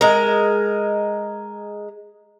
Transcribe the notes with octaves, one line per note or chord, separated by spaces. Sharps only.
G#3 A#4